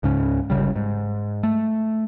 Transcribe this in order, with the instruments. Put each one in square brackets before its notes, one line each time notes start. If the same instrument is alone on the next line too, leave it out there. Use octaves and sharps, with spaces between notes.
[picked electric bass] C#2 G#2 C#3 C#4
G1 C2 C#3 G3
G#2
A3